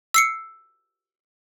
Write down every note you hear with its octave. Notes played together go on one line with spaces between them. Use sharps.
E6 C7 C#7